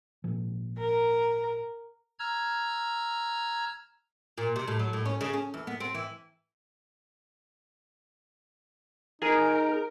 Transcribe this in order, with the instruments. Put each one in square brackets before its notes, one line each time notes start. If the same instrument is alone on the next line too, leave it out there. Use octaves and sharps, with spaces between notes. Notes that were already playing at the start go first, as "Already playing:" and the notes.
[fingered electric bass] G#1 A#2 F3
[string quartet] A#4
[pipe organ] A#5 E6 F6 G#6
[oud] A#2
C3
A2
F#3
A2
C#4
C#3
C#4
E2
B3
C4
E3
[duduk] D#4 [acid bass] G#4 [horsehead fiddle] A#4